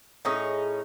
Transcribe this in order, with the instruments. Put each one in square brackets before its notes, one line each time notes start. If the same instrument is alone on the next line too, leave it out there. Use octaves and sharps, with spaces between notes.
[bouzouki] A2 C#4 D#4 G#4